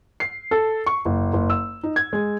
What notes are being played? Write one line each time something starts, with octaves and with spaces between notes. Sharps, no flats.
C7
A4
C#6
F#1
F#1
E6
D#4
G#6
G#3